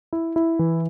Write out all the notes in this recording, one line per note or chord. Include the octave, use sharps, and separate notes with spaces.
E4
E4
E3